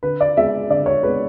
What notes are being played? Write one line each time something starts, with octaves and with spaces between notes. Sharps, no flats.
D3 B4
D5
G#3 B3 E5
D3 D5
C#5
G#3 B3 B4